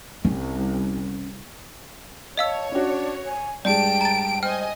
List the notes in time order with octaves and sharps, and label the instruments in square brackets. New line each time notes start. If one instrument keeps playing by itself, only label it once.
[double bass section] C2 [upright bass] C#4
[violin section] C#5 [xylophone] D#5 F5 E6 [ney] A5
[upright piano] C#4 F#4 [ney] D4
[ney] G#5
[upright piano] G2 G#3 [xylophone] D5 [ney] G5 [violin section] A5 D7
[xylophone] A#5 A6
[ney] C5 [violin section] D#5 G#5 [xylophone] G5 F6